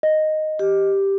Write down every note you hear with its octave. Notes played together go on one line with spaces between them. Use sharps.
D#5
G4